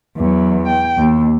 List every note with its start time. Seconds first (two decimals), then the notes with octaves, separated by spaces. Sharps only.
0.18 E2 F#3
0.68 G5
0.98 D#2